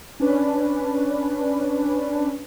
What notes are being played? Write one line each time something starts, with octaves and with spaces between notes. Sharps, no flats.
C#4 D4 B4